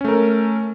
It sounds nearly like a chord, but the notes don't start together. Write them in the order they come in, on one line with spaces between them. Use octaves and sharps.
C#4 A3 A#4